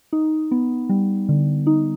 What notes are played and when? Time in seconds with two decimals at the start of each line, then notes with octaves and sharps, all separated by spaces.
0.13 D#4
0.51 B3
0.89 G3
1.29 D3
1.67 D#4